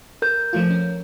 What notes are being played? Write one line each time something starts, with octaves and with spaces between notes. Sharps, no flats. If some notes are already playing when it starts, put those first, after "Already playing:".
A#4 G6
F3 A3 F4
C#4